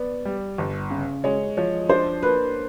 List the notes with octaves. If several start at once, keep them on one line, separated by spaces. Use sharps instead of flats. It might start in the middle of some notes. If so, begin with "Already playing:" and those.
Already playing: B3 D5
G3
G1
C#3
G#3 C#5
F3 C#5
D4 C5
A#3 B4